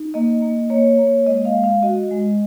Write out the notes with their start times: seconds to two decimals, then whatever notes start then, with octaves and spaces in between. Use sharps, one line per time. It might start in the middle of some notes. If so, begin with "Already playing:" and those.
Already playing: D#4
0.14 A#3 D#5
0.42 A#3
0.70 A#3 C#5
0.99 A#3
1.26 G#3 D#5
1.45 F5
1.55 G#3
1.64 F5
1.83 F#4 D#5
2.11 G#3